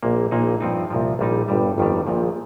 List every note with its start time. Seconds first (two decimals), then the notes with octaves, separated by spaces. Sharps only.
0.03 A#1 A#2 A#3
0.31 A#1 A#2 A#3 D#4
0.60 G2 F3 C4 D#4
0.90 C2 A#2 F3
1.19 A#1 A#2 G3 D#4
1.48 G1 G2 G3
1.78 G1 F2 D#3 G3
2.07 A#1 A#2 F3